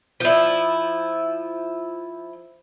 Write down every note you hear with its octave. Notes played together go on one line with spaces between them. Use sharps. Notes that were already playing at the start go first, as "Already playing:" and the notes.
F3 E4